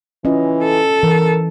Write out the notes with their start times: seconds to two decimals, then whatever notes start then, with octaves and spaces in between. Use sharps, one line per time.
0.25 E3 C#4 F4 D#5
0.63 A4
1.03 E3 A#4